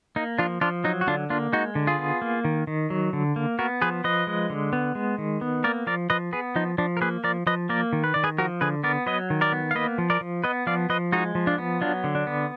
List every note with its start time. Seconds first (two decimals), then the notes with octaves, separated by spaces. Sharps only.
0.16 A#3 D#4
0.38 F3 D4 F4
0.61 F3 D4 F4
0.84 F#3 D#4
1.01 F#4
1.07 D3 D4 F4
1.30 A#3 D4 F4
1.53 G#3 D#4 F#4
1.75 D3
1.87 F4 G#4
1.99 B3
2.22 A#3
2.45 D#3
2.67 D#3
2.90 F#3
3.13 D3
3.36 A#3
3.59 B3 F#4 A#4
3.82 F3 G#4 B4
4.04 F3 B4 D#5
4.27 G#3
4.50 D3
4.73 B3
4.95 G#3
5.18 D#3
5.41 B3
5.64 A#3 A#4 D5
5.87 F3 A#4 D5
6.10 F3 B4 D#5
6.33 B3 G#4 B4
6.56 F3 D#4
6.78 F3 D4
6.97 A#4
7.01 A#3 G#4 B4
7.24 F3 A#4 D5
7.47 F3 B4 D#5
7.69 A#3 A#4 D5
7.93 D#3
8.04 B4
8.14 D#3 D5
8.24 G#4 B4
8.38 F3 F#4 A#4
8.61 D3 G#4 B4
8.84 B3 A#4 D5
9.06 F#3 B4 D#5
9.30 D#3
9.41 A#4 D5
9.52 B3
9.71 F5
9.75 A#3 B4 D#5
9.98 F3
10.10 A#4 D5
10.21 F3
10.44 B3 B4 D#5
10.67 F3 D5 F5
10.90 F3 B4 D#5
11.12 G#3 D#4 F#4
11.35 F3
11.47 D4 F4
11.58 B3
11.81 F#3 D4 F4
12.04 D3
12.15 D4
12.27 B3